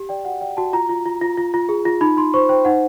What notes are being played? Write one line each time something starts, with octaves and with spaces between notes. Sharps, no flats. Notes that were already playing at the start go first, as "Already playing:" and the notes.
Already playing: G4
D5 G5
F#4 F#5
D5 G5
F#4 A5
F4 A#5
F4
F4
F4
F4
F4
G#4
F4
D#4 B5
D#4 C6
C5 C#6
C5 G5
D#4 F#5